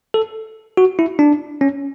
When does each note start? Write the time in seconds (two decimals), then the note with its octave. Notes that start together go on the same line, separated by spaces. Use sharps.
0.14 A4
0.77 F#4
0.99 E4
1.19 D4
1.61 C#4